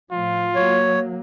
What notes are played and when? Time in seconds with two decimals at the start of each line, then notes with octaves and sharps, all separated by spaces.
0.12 A2 F3 F4
0.56 F#3 A#3 C#5